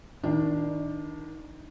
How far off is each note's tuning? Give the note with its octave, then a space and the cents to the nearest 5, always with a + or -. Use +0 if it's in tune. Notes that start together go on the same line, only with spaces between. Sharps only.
D#3 +20 D4 +0